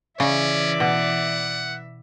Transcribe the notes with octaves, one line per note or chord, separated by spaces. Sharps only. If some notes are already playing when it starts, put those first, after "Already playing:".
C#3 E3 C#4 D5 E5
B2 F#5